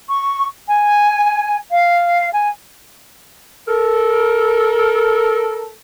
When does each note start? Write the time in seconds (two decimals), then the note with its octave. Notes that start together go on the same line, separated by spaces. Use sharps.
0.10 C#6
0.68 G#5
1.71 F5
2.33 G#5
3.68 A4 A#4